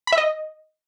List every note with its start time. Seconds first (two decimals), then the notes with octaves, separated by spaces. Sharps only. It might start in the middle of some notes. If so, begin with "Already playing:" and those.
0.07 B5
0.12 E5
0.18 D#5